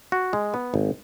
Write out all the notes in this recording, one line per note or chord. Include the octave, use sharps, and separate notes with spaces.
F#4
G#3
B3
G#1